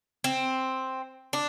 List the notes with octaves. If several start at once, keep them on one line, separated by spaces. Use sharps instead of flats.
C4
D4